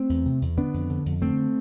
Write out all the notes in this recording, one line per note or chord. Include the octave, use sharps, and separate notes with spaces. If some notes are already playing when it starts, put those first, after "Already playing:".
Already playing: A3 C4
E2
C3
E2
D3 B3 D4
F2
D3
F2
D3 A3 C4